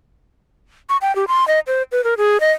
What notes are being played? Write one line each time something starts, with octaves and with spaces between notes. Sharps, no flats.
C#6
G5
G4
C6
D#5
C5
B4
A#4
G#4
D#5